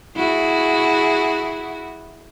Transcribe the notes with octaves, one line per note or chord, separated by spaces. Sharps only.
E4 F#4 G#4